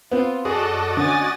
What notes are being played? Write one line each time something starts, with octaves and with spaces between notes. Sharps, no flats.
B3 C4 F4
F#2 F#4 G#4 A4 D5 D#5
D3 C#4 G#5 D#6 A6